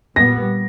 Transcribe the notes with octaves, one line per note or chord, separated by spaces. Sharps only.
A#2 G3 B3 A#6